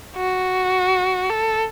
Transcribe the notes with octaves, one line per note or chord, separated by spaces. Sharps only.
F#4
A4